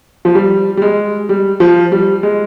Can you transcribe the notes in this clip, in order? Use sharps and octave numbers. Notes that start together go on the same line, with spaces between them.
F3
G3
G3
G#3
G3
F3
G3
G#3